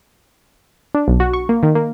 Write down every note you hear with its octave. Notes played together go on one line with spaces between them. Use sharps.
D4
B1
F#4
C#6
A#3
D#3
A#3